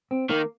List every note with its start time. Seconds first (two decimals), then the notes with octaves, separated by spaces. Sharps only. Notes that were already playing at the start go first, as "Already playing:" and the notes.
0.11 C4
0.30 D#3 A#3